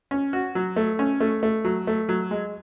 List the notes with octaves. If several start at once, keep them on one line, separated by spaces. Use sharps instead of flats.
C#4
F#4
F#3
A3
C#4
A3
A3
F#3
A3
F#3
G#3